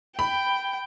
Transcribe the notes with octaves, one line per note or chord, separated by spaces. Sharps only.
G5 B5